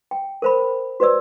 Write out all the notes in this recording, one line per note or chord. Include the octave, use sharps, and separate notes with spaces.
G5
A#4 C5 B5
F#4 B4 C5 D5 E6